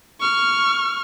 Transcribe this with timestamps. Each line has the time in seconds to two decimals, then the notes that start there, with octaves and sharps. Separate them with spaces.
0.20 C#6 F6